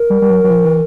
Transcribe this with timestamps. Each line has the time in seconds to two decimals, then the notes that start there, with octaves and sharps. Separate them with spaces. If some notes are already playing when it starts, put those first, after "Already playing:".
Already playing: A#4
0.10 G3
0.22 G3
0.30 F#3
0.44 F#3
0.50 F3
0.65 E3